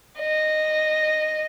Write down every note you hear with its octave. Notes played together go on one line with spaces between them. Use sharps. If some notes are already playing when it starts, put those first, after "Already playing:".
D#5